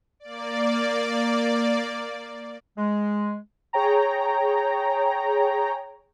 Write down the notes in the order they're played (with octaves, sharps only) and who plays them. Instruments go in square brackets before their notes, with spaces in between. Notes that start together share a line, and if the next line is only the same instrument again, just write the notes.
[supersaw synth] A#3 D5
[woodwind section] G#3
[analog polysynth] G#4 C#5 G5 A#5